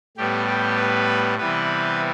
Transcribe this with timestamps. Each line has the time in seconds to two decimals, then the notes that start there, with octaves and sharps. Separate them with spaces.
0.17 A2 G3 B3 G4
0.47 G4
0.77 B4
1.38 C3 E3 G3 B3 B4